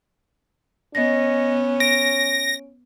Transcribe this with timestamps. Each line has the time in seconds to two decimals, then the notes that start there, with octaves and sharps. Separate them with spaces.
0.95 B3 C#4 D#5 A#6
1.80 A#6 D7